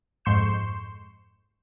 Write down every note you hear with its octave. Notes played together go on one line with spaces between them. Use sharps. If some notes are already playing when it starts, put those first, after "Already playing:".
F2 G#2 C6 C#6 G6 E7